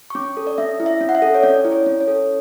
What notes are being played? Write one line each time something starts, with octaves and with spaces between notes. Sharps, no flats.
C#6
C#4 D6
A4
D5
C#4 E5
E4
E5
C#4
F#5
E5
A4
C#5
C#4 D5
E4
C#5
C#4
C#5
A4